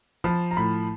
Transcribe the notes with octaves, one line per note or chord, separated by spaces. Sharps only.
F3 B5
A#5
A2 B5